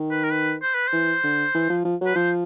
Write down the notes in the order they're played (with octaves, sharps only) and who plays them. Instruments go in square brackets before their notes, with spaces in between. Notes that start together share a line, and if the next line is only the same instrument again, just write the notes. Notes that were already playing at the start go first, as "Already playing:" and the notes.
Already playing: [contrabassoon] D#3
[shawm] B4
A#4
B4
C5
B4
[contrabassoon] E3 [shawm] C5
[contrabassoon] D3
E3
F3
F3
F#3
[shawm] B4
[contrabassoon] F3 [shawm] C5